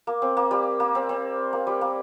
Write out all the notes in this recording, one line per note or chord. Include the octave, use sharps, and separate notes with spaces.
A#3
C4
A#3
G3
A#3
C4
C4
A#3
G3
A#3